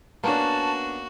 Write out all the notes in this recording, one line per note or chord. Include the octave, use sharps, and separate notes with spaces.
A#3 B3 C#4 D4 F#4 A5